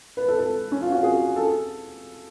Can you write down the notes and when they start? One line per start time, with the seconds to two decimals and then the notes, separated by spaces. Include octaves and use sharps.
0.17 B4
0.28 A4
0.39 A4
0.72 C#4
0.82 F4
0.92 F#4
1.03 G#4
1.36 A4